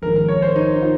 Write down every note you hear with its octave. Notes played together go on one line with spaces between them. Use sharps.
A#1 G#2 D#3 A#4
A#4
C#5
C5
D#4
D#4
F4